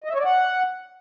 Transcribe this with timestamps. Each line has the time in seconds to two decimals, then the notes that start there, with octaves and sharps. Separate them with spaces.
0.04 D#5
0.09 E5
0.15 C#5
0.20 D5
0.25 F#5